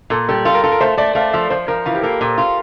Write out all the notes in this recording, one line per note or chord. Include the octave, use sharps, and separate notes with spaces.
A#2 A4
G3 A4
F4 A4
A#4
F4 A4
A#4
A3 C5
A3 D5
A3 F5
F3 E5
F3 C5
F3 A#4
E3 F4
G4
A#3 A4
A#2
F4